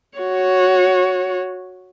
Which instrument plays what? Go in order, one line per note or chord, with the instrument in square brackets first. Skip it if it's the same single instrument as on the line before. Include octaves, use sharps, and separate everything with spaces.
[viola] F#4 C#5